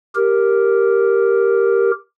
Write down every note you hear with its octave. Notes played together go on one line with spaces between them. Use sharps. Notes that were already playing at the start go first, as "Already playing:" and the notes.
G4 A#4